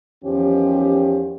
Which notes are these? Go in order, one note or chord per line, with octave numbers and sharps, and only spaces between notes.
E2 D#3 F3 C#4 G4